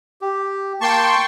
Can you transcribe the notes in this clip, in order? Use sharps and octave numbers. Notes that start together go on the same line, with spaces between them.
G4
A#3 G5 A5 C6 C#6